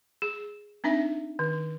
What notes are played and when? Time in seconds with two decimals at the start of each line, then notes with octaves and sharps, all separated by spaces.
0.22 G#4
0.84 C4 D4 D#4 E5
1.39 D#3